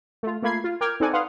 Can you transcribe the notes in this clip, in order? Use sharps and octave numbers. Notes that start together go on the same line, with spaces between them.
A3 F4
A3 A#3 F4 B5 G#6 C7
F4
A#4 G5 D6 F6 G#6
C4 D#4 A4 D5 F#5 G#5
B4 F5 F#5 C6 D#6